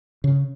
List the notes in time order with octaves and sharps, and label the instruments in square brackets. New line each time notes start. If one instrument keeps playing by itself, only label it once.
[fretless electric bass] C#3